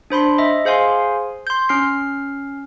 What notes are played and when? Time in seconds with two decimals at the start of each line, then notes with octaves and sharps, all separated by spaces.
0.10 D4 C5 B5 C6
0.38 D#5 E5
0.65 G#4 C5 F5 G#5 C6
1.47 C6 G6
1.69 C#4 F6 C7